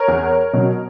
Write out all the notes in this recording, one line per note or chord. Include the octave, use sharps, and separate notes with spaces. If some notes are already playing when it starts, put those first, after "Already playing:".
Already playing: A#4 C#5
E2
B2 F#3